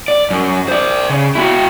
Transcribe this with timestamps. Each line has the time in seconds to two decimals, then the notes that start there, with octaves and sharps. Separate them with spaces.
0.08 D5
0.30 F#2
0.68 C5 D5
1.10 C#3
1.35 E4 F#4